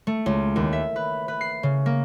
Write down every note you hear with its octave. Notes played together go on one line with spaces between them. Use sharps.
A3
C#2
D#2
E5
B4
B4
C7
C#3
A#3